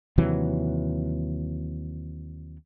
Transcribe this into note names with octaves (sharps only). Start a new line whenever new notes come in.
D#2 C3 E3 F#3